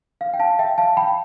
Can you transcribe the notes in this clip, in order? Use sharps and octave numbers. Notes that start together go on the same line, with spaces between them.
F5
G5
F5 A5
E5 G5
F5 A5
G5 B5